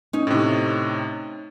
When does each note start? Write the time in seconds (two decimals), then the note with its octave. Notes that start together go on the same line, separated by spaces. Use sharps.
0.13 C#4 D#4
0.27 A2 C3